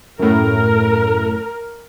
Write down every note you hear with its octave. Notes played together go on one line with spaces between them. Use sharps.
F#2 A2 A#4